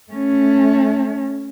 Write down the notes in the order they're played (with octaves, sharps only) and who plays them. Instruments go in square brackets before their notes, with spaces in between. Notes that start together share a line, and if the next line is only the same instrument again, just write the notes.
[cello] A3 C#4